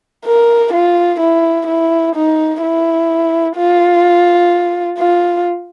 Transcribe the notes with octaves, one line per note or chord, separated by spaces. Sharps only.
A#4
F4
E4
E4
D#4
E4
F4
F4